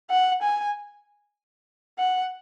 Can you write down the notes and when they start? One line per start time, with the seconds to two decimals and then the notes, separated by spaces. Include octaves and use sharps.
0.10 F#5
0.42 G#5
1.98 F#5